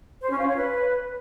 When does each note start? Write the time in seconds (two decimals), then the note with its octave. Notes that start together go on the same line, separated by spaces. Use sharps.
0.21 C5
0.30 C#4
0.39 F4
0.47 C#5
0.56 B4